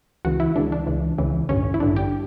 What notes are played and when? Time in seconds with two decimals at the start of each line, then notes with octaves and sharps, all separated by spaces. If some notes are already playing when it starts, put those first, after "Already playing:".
0.25 C#2 C#3 E3 F#4
0.40 E4
0.56 C#2 C#3 E3 D4
0.72 D4
0.87 C#2 C#3 E3
1.18 C#2 C#3 E3
1.49 A1 G2 D3 C#4
1.74 E4
1.80 A1 G2 D3 D4
1.96 G4